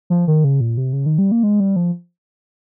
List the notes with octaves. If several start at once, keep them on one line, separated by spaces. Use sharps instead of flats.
F3
D#3
C#3
A#2
C3
C#3
D#3
G3
A#3
G#3
G3
F3